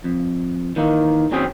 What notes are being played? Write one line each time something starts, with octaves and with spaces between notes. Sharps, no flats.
F2
D#3 E3 A#3 D#4
D#2 F#3 C4 C#4 G#4 G5